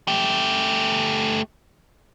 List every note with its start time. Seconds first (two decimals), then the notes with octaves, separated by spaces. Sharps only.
0.08 A3 G4